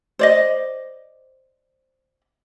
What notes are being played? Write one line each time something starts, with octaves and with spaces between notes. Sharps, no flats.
C5 D5 D#5